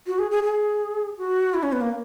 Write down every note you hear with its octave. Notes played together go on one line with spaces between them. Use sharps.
F#4
G#4
G#4
G#4
F#4
E4
C#4
B3
A#3